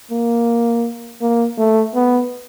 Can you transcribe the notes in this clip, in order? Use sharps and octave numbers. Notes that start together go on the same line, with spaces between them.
A#3
A#3
A3
B3